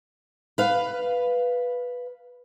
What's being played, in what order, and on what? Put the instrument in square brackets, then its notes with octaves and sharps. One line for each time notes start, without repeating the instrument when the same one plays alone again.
[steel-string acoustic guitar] B4 F5